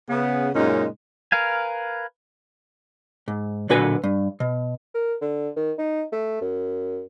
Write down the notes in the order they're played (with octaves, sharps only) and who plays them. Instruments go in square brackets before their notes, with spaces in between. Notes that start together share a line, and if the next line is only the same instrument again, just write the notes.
[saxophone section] C#3 B3
F#2 A#2 C#3 G#3 C#4 D#4
[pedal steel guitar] A#4 B4 F5 G#5
[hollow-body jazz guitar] G#2
B1 A#2 D3 F#4 B4 G#5
G2
B2
[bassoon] A#4
D3
D#3
D#4
A3
F#2